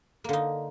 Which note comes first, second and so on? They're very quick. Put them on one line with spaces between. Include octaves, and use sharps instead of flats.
A#3 D3 D#4